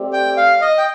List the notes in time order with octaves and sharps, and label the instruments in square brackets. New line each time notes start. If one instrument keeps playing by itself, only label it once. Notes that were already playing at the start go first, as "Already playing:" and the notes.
Already playing: [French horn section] A3 C4 G4 D5
[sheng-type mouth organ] G5
F5
D#5
G5